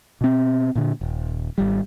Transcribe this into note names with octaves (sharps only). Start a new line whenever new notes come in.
B2 C4
A#2 D3 A#3
D#1
G#1 G3